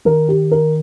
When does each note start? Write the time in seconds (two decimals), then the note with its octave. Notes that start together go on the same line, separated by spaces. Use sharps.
0.05 D#3 A#4
0.29 G4
0.51 A#4